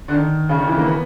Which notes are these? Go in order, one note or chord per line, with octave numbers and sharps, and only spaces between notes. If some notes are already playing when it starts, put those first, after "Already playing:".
D3
D#3
C#3
D#3
E3
A#3
B3